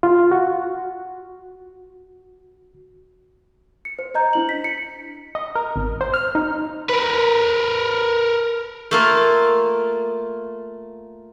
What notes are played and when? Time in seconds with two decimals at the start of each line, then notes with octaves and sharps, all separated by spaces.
0.03 F4
0.31 F#4
3.85 C#7
3.99 C5
4.15 C5 D#5 A#5 G6
4.33 D4 E4 F#7
4.49 B6
4.64 C#7
5.35 D#5
5.55 A#4
5.76 G#1
6.01 C5
6.14 F6
6.35 D#4
6.90 A#4 B4
8.91 A3 A#3 F4